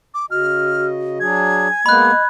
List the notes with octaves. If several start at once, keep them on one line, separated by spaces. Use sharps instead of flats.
D6
C#3 F#4 D#5 F6
F#3 D4 G#4 G#6
G#5
G#3 A#3 B3 D#5 B5 F#6